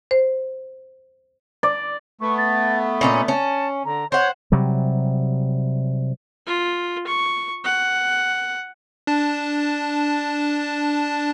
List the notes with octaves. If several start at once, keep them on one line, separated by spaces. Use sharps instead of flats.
C5
D5
A3 B3 C#6
A6
A#2 C#4 D#4 B5
C#4 A5
D3 A#5
C5 C#5 F#5 G6
C3 F#3 G3
F4
C#6
F#5
D4 A5